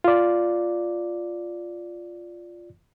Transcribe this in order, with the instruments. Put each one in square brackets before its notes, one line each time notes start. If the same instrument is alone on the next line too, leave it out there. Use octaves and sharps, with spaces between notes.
[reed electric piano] F4 D5